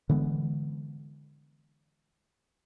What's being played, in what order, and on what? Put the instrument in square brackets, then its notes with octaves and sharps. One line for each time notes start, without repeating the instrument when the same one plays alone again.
[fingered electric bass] D3 E3 G#3 B3